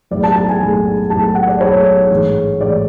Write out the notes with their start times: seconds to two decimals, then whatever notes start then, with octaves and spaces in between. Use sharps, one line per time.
0.11 B1 A2 G#3 D5
0.23 A5
0.36 A5
0.49 G#5
0.61 B1 A2 G#3
1.10 B1 A2 G#3 A5
1.35 F#5
1.48 D5
1.61 B1 A2 G#3 C#5
2.10 A1 G#2 G#3
2.61 A1 G#2 G#3 D5